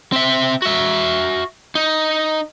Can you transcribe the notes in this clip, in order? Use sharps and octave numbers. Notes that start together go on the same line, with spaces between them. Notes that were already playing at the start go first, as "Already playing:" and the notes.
C4 E5
F#4 E5
D#4